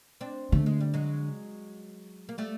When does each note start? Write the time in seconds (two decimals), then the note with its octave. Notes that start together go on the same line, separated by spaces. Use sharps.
0.21 C4 D4
0.52 D3 A3
0.66 G#3
0.80 G3
0.94 F#3 G#3
2.29 A#3
2.38 G3 A3